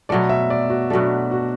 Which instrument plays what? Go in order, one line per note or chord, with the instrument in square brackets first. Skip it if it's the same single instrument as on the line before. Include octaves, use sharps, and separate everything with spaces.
[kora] B2 F#3 A3 [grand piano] D5
[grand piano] E5
D5
F#4
[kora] B2 F#3 A3 [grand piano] D4
[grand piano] F#4